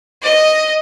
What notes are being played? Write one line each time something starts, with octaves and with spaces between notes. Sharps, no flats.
D#5